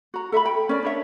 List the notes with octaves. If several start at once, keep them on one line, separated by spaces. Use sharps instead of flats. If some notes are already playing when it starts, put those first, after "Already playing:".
F#4 A#5
A4 E5 A#5 B5
G5 B5
C#4 A#4 D5
D4 C#5 E5